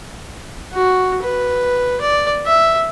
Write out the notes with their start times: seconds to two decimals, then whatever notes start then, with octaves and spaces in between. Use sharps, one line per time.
0.73 F#4
1.23 B4
2.01 D5
2.46 E5